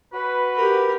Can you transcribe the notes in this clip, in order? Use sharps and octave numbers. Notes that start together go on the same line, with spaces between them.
F#4 B4
G4 A#4